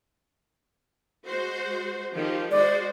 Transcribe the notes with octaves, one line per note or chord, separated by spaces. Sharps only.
G#3 F#4 C5
D#3 F3 G4
G#3 F#4 C5 D5